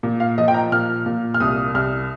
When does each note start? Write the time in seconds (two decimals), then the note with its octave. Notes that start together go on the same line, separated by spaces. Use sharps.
0.03 A#2
0.20 F5
0.38 F3 D#5
0.48 G5
0.54 A#5
0.72 A#2 F6
1.06 A#2
1.34 F6
1.40 C2 D#6
1.74 C2 F6